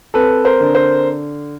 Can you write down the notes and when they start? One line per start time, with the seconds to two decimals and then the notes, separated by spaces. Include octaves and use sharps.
0.14 C4 A4 B4
0.45 A#4 C5
0.60 D3
0.75 A#4 C5